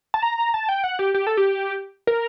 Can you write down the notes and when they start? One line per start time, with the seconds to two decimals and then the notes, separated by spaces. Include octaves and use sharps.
0.14 A5
0.23 A#5
0.54 A5
0.69 G5
0.84 F#5
0.99 G4
1.14 G4
1.27 A4
1.37 G4
2.07 A#4